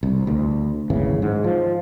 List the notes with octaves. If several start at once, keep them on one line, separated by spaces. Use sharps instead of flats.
C2
D2
D1 G#1 C#3 E3
G#2
F3